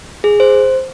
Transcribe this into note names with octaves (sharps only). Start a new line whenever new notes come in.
G#4
C5